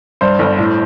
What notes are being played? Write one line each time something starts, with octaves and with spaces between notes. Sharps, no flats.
G2 C5
G1
A2